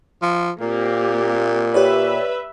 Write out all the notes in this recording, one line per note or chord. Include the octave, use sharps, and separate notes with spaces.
F3
A#2 A#3 C4 G4
G4 B4 C#5 D5 E5